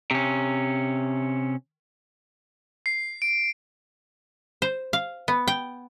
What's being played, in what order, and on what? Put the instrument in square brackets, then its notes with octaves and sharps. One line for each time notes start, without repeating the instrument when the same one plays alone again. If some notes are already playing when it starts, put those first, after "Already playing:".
[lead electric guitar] C3 C#4
[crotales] C7
D7
[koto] C5
F5
B3
G5